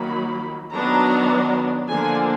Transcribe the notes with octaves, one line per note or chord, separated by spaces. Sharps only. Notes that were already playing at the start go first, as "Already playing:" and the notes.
Already playing: D#3 F#3 A#3 B5
D#3 F#3 B3 D4 A#5
D3 F3 A#3 D4 G#5